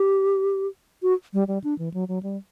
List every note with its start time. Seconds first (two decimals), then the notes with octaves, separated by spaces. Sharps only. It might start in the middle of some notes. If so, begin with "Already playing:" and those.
Already playing: G4
1.03 F#4
1.33 G3
1.48 G3
1.64 D4
1.79 E3
1.94 F#3
2.08 F#3
2.23 G3